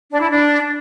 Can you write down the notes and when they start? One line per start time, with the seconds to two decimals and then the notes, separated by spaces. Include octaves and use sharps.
0.11 D4
0.21 E4
0.31 D4